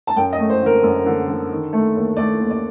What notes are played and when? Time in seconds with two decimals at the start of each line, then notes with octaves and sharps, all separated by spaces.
0.07 A5
0.16 F#2 G5
0.33 D#5
0.39 A3
0.50 C5
0.62 D3 A#4
0.83 F#2
1.05 D3
1.28 D3
1.51 D#3
1.73 A3
1.96 D#2
2.17 A3 D5
2.40 D#2
2.51 D5